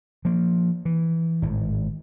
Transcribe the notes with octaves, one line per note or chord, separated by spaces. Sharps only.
F3 A#3
E3
G#1 A2